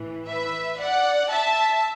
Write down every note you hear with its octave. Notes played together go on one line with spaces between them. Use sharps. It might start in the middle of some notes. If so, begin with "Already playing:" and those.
Already playing: A2 E3
B4 E5
D5 F#5
E5 A5